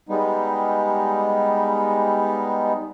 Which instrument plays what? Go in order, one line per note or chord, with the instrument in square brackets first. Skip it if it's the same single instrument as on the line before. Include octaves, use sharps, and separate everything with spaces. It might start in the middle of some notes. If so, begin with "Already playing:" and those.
[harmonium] G3 G#3 B3 D#4